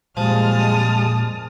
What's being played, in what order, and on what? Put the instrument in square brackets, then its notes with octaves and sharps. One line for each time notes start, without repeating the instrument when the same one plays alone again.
[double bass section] F2 G3 G#3 [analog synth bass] A#2 [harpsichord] F3 [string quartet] A5 D#6 F6